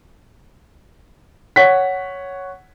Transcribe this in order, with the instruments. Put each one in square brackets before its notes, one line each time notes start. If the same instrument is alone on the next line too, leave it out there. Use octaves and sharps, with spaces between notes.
[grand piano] C#5 F#5 B6